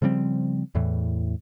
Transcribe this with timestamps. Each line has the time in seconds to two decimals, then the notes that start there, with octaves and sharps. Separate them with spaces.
0.02 C#3 F3 G3 C4
0.75 E2 A2 E3